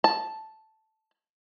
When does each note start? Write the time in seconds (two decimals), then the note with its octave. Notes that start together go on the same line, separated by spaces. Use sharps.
0.04 A5